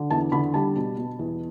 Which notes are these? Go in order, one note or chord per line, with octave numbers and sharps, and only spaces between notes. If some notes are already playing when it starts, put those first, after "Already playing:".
Already playing: D3
E2 A5
D3 B5
G3 A5
B2
B2
E2